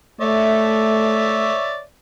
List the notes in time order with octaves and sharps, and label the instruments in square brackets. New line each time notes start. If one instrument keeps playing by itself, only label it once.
[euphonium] A3 [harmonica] C#5 D5 E5